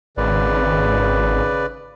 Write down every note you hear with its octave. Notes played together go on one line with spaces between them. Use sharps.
G#1 C#3 B4 D5